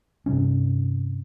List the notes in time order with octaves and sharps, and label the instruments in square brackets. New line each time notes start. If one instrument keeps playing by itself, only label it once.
[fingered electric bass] G2 C3 G3 C#4